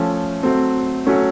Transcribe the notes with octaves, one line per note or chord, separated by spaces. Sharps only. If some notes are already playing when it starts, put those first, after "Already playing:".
Already playing: F3 A3 C#4
F#3 A3 C4
F#3 A3 C#4